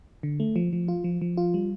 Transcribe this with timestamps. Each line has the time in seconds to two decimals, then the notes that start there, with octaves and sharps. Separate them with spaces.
0.23 D3
0.40 A3
0.56 F3
0.73 F3
0.88 F4
1.04 F3
1.21 F3
1.37 F4
1.54 G3